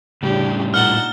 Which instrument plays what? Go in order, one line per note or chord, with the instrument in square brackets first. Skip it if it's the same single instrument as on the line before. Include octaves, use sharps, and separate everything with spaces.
[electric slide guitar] A2 G3 [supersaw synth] C#3 [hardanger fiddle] D4 G4
[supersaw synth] A#2 A6 E7 [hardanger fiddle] D#4 F#5 [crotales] F6 G7